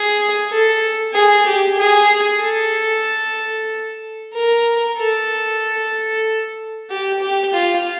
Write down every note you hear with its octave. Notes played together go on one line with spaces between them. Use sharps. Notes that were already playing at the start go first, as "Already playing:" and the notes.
Already playing: G#4
A4
G#4
G4
G#4
A4
A#4
A4
G4
G4
F4